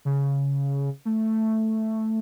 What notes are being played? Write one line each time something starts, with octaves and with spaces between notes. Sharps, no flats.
C#3
A3